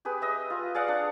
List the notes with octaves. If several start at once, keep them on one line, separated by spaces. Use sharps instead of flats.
G4 G#4 B4
D#5 E5
F4
G#4 D5 F5 F#5
D4